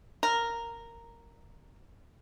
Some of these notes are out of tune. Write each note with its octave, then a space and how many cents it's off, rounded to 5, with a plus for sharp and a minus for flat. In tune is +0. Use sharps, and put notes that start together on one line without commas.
A#4 -5